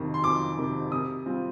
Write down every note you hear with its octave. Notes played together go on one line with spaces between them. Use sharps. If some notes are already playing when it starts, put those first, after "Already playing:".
Already playing: F2 C3 D#3
C6
F2 D6
C3 D#3
C3 D#6
G3 C4 F4